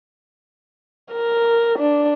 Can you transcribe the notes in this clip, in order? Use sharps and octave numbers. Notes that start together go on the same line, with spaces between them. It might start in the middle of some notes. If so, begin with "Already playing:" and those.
A#4
D4